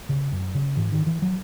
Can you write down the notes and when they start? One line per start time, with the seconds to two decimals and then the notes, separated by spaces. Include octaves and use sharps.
0.09 C#3
0.32 F#2
0.55 C#3
0.77 G#2 E3
0.92 D#3
1.06 E3
1.22 F#3